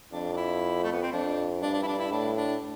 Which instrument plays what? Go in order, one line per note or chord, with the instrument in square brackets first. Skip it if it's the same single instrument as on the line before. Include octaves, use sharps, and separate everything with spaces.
[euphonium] F2 [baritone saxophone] D4
[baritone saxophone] D4
E4
A3
B3
C4
[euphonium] F2 [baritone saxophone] D4
[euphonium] G2 [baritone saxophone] D4
[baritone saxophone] D4
E4
D4
E4
[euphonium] A2 [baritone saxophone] D4
[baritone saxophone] D4